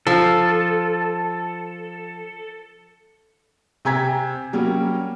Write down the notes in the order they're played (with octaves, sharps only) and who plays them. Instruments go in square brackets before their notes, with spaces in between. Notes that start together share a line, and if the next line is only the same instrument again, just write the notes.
[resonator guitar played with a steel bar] F3 [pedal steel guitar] A4
[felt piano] C3 C4 G#5 A#5 G#6 B6
F#3 G3 A#3 C#4